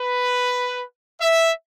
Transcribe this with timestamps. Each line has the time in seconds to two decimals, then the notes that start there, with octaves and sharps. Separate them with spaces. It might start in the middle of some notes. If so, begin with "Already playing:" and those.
Already playing: B4
1.20 E5